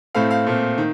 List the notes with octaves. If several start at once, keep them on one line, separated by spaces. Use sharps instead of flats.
A2 A3 C4 F5
F5
A#2 A3 C4
D#3